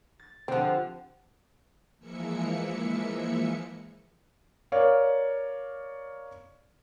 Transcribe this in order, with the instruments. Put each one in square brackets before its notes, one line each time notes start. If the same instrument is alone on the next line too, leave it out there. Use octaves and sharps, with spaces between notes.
[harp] A6
[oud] D3 F3 [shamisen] C4 [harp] G4 F#5
[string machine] E3 F3 G#3 A#3 E5 C#7
[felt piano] A#4 C#5 D5 F5